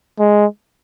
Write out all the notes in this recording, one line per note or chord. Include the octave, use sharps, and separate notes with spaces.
G#3